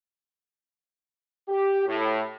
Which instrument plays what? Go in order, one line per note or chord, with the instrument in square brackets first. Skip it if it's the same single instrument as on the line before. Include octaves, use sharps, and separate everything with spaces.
[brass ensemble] G4
A2